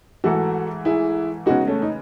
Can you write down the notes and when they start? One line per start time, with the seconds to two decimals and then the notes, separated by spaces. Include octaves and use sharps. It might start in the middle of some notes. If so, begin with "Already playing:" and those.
0.24 G#2 E3 A3 F#4 A4
0.85 E4 G#4
1.46 C#3 G#3 B3 D#4 F#4
1.67 A3 C#4
1.82 D#4